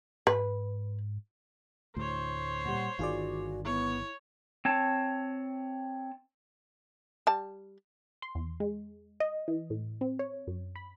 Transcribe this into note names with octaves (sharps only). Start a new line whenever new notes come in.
G#2 B4
D2 A2 C5 C#5
A#2 G3 F#5
G1 D#3 F4 F#4 G#4 D5
B3 E4 C#5
C4 C#5 A5
G3 A5
C6
E2
G#3
D#5
E3
A2
C4
C#5
F#2
B5